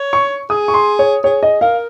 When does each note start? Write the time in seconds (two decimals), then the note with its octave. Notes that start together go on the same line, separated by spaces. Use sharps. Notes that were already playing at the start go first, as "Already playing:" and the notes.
Already playing: C#5
0.13 C#6
0.50 G#4 D#6
0.68 C#6
0.74 C6
0.99 C#5
1.24 G#4 C#5
1.43 D#5
1.61 A#4 F5